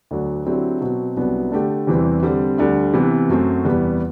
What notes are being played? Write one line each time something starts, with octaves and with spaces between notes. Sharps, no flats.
D2 D3 F#3
D3 F#3 C4 E4 G4
B2 F#3 C4
C2 C3 F#3 B3 D4
D3 A3 D4 G4
E2 C3 E3 G3 C4
D3 G3 C4
D2 D3 G3
C3 E3 B3
F#2 F#3 A3 C4 F#4
E2 C3 G3 B3